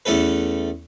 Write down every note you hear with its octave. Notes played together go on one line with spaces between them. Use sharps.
E2 A3 C#4 A4 B4